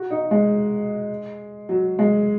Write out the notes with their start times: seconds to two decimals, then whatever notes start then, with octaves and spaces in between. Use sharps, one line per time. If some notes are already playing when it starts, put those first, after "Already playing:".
Already playing: F#4
0.11 D#4
0.31 G#3
1.69 F#3
1.99 G#3